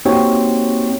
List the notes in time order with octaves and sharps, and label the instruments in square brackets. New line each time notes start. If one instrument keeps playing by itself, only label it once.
[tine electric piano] A#3 C4 D#4 F#4 G4 C#5